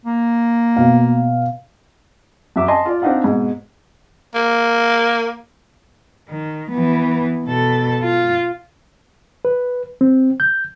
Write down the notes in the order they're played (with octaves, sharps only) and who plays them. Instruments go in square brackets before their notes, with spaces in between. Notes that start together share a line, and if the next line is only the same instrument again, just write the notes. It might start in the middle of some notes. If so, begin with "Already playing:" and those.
[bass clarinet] A#3
[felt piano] B2 F5
[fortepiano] F#2 E5 D6
D#5 G#5 A5 C6
F4 D5
C4 D4 D#4 D#5 F5 F#5
G#2 B2
[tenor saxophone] A#3
[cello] D#3
E3 B3
B2 A4
F4
[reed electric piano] B4
C4
G6